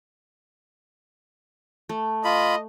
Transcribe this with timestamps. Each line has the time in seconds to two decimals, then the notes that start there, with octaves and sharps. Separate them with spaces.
1.89 A3
2.24 F4 D#5 B5